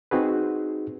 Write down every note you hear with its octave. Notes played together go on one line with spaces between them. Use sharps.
C4 D#4 F#4 G#4 B4